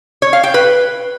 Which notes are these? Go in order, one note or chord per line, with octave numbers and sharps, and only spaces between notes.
C#5
F5
G5
B4